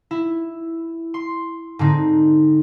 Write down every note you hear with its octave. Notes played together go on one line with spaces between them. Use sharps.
E4
C6
G#2 D3 C4 D#4